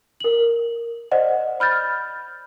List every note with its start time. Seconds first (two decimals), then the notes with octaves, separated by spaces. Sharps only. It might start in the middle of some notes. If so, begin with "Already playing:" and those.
0.20 A#4 F#7
1.12 C5 D5 D#5 F#5
1.60 B5 F6 G6 A6